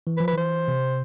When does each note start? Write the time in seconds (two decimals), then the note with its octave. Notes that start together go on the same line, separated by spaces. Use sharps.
0.07 E3
0.17 B4
0.20 F3
0.28 B4
0.33 E3 C5
0.68 C3